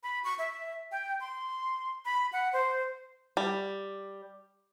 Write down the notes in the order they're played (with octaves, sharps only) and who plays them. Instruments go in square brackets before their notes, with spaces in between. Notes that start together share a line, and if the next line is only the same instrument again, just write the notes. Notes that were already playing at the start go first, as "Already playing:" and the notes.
[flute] B5
C#6
E5
G5
C6
B5
F#5
C5
[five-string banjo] G3